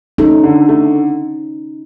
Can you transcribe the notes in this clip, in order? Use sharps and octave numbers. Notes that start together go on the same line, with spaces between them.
A3 C#4 D#4
D3
A3